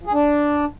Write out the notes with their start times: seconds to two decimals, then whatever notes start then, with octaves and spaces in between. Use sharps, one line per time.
0.01 F3
0.07 G#4
0.13 D4